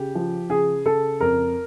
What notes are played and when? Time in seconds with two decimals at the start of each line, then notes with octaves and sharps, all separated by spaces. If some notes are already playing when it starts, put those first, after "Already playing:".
Already playing: C#3 G4
0.15 F3
0.50 C#3 G#4
0.85 C#3 A4
1.20 F2 A#4